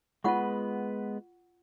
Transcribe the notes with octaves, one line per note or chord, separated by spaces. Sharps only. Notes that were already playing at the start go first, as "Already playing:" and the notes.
G#3 B3 F4 B4 F#5 C#6